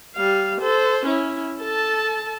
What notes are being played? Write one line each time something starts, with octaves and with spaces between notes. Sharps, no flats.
G3 F5
A4 C5
C#4 E4
A4 A5